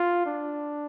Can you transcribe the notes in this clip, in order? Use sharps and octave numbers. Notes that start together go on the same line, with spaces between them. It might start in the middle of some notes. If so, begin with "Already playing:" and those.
Already playing: F4
D4